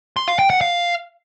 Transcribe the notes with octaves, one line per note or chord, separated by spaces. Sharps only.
C6
F5
G5
F#5
F5